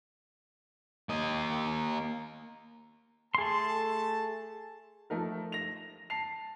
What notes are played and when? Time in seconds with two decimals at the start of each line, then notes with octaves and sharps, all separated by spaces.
1.09 A#3 D#5
3.35 A3 G#4 A4 A5 C6
5.10 F3 A3 D#4 A#4
5.52 A#6 F7
6.10 A5 C7 F7